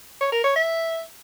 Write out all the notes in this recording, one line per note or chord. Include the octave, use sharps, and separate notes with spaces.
C#5
A#4
C#5
E5